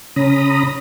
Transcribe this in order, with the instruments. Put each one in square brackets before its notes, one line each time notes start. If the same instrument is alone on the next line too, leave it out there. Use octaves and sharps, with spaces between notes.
[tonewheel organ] C#3 C#4 A#5 B5 D#6